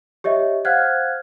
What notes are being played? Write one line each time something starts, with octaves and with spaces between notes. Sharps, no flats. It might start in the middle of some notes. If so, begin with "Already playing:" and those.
G4 C#5 D#5 E5
C5 F5 F#5 F6 F#6 G#6